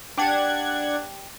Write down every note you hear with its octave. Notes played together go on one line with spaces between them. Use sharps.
D4 G4 D5 F#5 G5 G#6